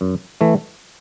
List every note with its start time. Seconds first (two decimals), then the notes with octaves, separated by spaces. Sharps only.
0.01 F#2
0.41 E3 A3